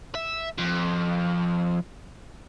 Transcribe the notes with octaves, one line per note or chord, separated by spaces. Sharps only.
E5
F2